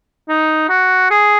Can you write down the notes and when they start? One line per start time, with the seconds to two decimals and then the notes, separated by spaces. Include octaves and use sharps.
0.29 D#4
0.69 F#4
1.10 G#4